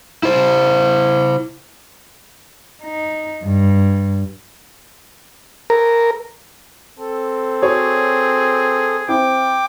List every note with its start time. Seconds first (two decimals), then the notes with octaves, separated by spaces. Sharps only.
0.23 E4 C5
2.83 D#4
3.44 G2
5.70 A#4
6.99 C4 A4
7.62 F#4 G#4 C#5
9.08 C4 E4 G5 D6